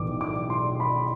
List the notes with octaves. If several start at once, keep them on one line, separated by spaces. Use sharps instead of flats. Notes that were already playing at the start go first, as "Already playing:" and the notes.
Already playing: B1 A2 E3 D6
D6
C6
B5